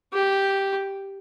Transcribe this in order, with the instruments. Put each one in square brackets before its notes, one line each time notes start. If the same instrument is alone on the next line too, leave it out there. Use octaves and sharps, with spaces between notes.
[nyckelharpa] G4